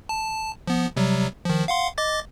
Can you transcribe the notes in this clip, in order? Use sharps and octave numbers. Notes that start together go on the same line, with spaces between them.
A5
F3 B3
C3 F#3 G3
D#3 F3
F5 F#5 C6
D#5 D6 A6